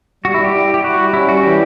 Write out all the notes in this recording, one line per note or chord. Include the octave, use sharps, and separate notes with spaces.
G3 F#4
E4
G3 G4
E4
E4 G4
E4 F#4
G3
C#4 E4
G3 F#4
E3 G4